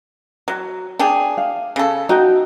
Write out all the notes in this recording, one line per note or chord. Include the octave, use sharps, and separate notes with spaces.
F#3
D4 G4 G#4
F5
C#3 A4
D#4 F#4 G5